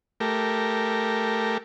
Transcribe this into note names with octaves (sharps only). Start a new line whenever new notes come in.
A3 G4 A#4